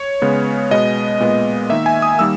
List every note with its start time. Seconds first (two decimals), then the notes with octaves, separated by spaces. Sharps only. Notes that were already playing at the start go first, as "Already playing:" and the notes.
Already playing: C#5
0.22 C#3 G#3 B3
0.71 B2 G#3 B3 D#5
1.20 A#2 G#3 B3
1.70 D#3 A#3 E5
1.86 G#5
2.02 D#6
2.19 D#3 G3 A#3 E6